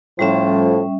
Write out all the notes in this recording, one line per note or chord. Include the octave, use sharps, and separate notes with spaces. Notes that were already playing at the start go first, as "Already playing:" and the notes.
A2 F3 G3 C#4 E5